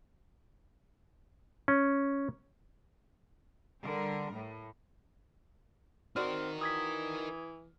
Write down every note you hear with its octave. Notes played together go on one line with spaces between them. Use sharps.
C#4
D3 G3 A#4
A2
C4 D#4 F#4 A#4 D5 F6
E3 D#6 G#6 B6